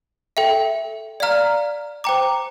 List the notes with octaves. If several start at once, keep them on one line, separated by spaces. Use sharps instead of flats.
A4 E5 G5
D5 F5 A#5 F6
C5 G5 A#5 D6